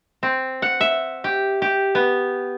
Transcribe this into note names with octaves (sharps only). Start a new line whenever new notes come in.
C4
F#5
E5
G4
G4
B3